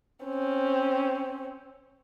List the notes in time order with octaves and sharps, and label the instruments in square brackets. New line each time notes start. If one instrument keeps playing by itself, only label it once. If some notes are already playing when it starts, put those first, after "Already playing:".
[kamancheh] C4 C#4